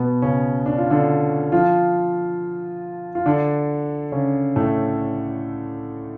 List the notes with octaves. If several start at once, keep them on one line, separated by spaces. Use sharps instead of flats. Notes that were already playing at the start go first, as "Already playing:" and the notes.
Already playing: B2 B3
C#3 C#4
D4
F4
D3 D4
F3 F4
F4
D3 D4
C#3 C#4
A2 A3